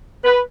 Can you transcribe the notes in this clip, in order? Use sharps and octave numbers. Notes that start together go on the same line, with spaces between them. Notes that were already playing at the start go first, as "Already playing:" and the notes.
B4